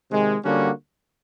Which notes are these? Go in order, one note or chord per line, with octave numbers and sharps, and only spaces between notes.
C3 D#3 G#3
D3 G3 A#3 C#4 F#4